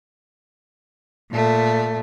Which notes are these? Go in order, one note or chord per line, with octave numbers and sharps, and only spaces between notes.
A#2 A3